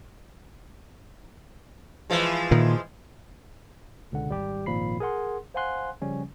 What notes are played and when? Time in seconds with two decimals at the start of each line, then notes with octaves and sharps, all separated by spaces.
2.10 E3 F3 G#3
2.51 A#2 D#3
4.12 C#2 B2 D3 F#5
4.29 G#1 G3 G4
4.66 G#1 A#2 F3 B5 C7
5.00 G#4 A#4 F#5 C6
5.54 C5 F5 F#5 G#5 C6 F#6
6.02 C#3 F3 G3 C#4